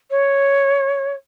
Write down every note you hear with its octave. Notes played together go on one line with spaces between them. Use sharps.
C#5